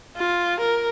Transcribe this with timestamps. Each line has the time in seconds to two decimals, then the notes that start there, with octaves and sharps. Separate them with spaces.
0.17 F4
0.60 A#4